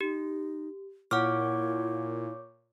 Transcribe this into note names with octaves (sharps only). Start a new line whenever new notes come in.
D#4 G4
A#2 E4 C#5 F#5 C#6 D6 F6